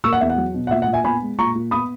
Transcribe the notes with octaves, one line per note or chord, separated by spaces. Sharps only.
A#3 C#6 E6
F#5
E2 E5
F#5
F#3
B2
F#5
A#2 E5
F#5
A#2
E5 G#5
B3 G#5 B5
G#3
A#2 A#5 C#6
A#2
B3 B5 D#6